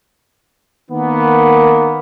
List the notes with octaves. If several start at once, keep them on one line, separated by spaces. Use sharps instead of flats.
D#3 A#3 B3